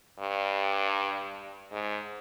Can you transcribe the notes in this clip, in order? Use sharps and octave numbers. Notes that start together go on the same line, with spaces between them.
G2
G#2